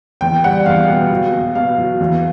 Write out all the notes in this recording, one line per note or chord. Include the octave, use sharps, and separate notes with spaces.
E2 G5
G3 F#5
E2 F5
B2
F#3
B2
B2 F5
F#3
E2